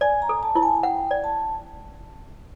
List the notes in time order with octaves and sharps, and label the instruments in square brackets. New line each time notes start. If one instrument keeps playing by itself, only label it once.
[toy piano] D5 [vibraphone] G#5
[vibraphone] A#5
[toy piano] A4
[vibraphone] A5
[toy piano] E4 [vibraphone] A5
[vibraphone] G#5
[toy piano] F#5 [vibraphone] G5
[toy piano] D5
[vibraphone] A5